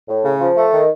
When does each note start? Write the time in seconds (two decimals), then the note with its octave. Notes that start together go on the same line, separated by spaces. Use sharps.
0.08 A2
0.24 C#3
0.41 F3
0.57 A3
0.73 D#3